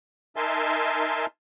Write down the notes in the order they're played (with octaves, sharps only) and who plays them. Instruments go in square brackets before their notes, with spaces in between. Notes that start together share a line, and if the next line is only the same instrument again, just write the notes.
[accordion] D#4 A#4 E5 G#5 A5 C6